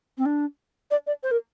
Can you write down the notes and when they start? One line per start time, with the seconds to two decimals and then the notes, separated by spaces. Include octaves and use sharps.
0.18 C4
0.26 D4
0.91 D5
1.07 D5
1.23 C5
1.31 A#4